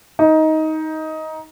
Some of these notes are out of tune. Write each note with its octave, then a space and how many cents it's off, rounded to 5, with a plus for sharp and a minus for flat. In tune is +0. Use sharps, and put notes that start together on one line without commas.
D#4 +15